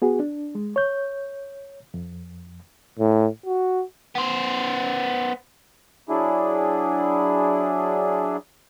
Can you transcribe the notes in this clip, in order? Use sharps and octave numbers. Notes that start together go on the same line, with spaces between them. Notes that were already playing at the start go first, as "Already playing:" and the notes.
B3 F#4 G#4
D4
G#3
C#5 G6
F2
A2
F#4
B3 C5
F#3 D4 E4 G#4